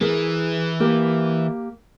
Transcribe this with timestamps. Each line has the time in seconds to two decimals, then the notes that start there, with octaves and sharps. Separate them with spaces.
0.01 E3 G#4 A#4 B4
0.80 A#3 G4 A#4